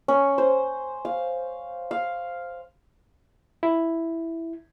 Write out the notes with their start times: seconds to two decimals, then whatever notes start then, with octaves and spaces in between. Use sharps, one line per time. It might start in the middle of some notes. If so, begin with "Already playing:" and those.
0.08 C#4
0.38 C5
1.05 F5
1.91 F5
3.63 E4